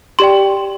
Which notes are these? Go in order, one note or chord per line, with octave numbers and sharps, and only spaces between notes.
G4 D5 G5 C6